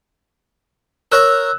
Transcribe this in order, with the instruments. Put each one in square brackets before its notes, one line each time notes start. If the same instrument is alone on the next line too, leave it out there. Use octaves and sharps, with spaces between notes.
[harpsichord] A#4 C#5 A#5 [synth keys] E6 F#6